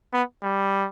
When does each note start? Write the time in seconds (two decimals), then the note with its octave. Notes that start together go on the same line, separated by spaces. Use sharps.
0.14 B3
0.42 G3